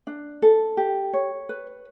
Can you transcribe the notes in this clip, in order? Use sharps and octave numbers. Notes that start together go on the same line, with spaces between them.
D4
A4
G4
C#5
B4